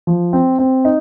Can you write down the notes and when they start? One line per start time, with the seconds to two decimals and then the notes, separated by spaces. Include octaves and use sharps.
0.07 F3
0.33 C4
0.59 C4
0.85 D#4